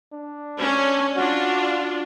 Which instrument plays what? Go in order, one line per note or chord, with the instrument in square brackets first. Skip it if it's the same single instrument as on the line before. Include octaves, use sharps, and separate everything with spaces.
[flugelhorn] D4
[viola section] C#4
[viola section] D4 F4 [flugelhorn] F#4